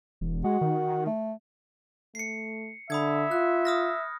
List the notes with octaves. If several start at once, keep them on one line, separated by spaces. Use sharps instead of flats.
E1
G#3 F#4
D#3
A3
A3 C7 C#7
D3 E5 B5 D#6 G#6
F4 F#6
D#6 F6 A#6